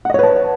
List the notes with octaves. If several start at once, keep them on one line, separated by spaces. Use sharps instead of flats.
B4 C#5 D#5 F#5 A5